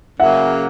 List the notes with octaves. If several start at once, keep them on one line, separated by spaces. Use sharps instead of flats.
C#3 F#3 A#3 E5 F#5